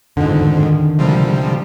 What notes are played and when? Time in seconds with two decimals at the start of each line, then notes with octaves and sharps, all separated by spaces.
0.17 F2 G#2 D3 D#3
0.99 C3 F3 G3